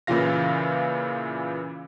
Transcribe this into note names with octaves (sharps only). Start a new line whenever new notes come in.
A#2 C#3 E3 F4 F5 A#6